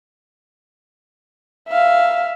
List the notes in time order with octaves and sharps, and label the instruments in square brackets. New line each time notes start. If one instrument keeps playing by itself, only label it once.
[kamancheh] E5 F5